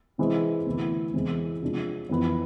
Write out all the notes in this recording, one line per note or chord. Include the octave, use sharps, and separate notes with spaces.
C3 E3 G#3 C4
D2 C3 E3 B3 E4
E2 C3 E3 G#3 C4
C3 F3 G#3 D4
F2 E3 B3